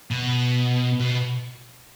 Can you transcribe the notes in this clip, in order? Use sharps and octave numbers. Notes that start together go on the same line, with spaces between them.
B2
B2